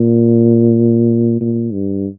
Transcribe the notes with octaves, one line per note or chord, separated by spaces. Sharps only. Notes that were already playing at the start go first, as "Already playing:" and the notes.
Already playing: A#2
A#2
G2